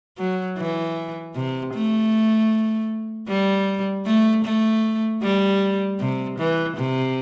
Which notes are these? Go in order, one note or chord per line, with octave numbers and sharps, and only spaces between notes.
F#3
E3
C3
A3
G3
A3
A3
G3
C3
E3
C3